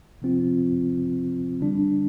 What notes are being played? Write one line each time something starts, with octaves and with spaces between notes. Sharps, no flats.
C3 F3 C4 F4
D3 G3 D4